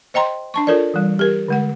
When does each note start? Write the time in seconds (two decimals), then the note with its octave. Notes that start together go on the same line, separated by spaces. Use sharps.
0.14 C5 D#5 G5 A#5 C6
0.54 D4 A5 C#6
0.67 F4 A4 A#4 C#5 D5
0.94 E3 G3
1.19 G4 A#4
1.48 D3 G#3 F#5